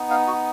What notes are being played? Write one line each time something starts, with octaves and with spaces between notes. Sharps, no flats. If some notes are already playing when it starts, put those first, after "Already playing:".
Already playing: B3 D#4
F5
F#4